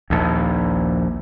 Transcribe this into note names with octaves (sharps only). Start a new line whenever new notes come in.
A#1 D#2